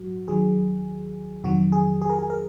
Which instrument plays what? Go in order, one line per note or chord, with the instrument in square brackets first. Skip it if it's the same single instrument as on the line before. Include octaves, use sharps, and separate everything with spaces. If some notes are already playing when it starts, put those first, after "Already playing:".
Already playing: [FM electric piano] A#1 G#2 F#3 F#4
D#2 D#3 F#3 G#4
F2 C3 D#3 F#3 F#4
G#4
G#4
A#4
G#4
A#4